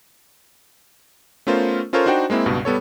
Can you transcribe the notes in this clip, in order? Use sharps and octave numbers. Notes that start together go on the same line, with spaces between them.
A3 B3 C#4 F4 A#4 C5
C#4 F4 A4 A#4 C5 C#5
D4 D#4 F#4 C5 G5
G#3 A#3 C4 E4
C#2 G2 B2
G3 B3 A4 C#5